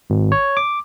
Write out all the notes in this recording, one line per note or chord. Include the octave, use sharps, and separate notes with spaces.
G#1
C#5
D6